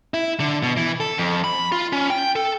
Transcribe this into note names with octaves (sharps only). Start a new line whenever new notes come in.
E4
D3
B2
E3
A4
F2
B5
F4
C#4
G5
A4